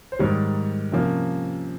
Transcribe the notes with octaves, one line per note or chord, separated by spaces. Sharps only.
C5
G#2 D#3 G3 C#5
C3 F3 A#3 C#4